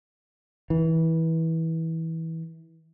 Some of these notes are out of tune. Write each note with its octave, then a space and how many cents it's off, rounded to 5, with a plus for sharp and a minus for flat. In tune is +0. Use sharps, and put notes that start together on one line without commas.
E3 -25